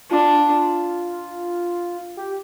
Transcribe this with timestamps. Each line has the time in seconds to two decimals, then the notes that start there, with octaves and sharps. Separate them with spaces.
0.11 D4 F4
2.17 G4